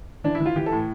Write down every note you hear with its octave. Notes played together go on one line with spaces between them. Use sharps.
E3 D4
E4
E3
F4
E3 G4
A4
A2